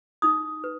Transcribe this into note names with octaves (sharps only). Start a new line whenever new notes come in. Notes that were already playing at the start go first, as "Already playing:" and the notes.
D#4 D#6
B4